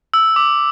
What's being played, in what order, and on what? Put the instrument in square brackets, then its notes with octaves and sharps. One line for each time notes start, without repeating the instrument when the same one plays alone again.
[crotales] E6
D6